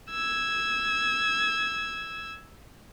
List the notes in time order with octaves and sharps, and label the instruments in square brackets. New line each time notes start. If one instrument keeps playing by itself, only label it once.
[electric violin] E6 G#6